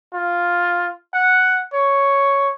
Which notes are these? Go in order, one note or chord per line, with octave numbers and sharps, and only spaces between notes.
F4
F#5
C#5